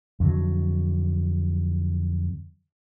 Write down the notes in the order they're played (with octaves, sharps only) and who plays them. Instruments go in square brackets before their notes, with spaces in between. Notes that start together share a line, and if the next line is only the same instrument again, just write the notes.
[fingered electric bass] F2 D3 F#3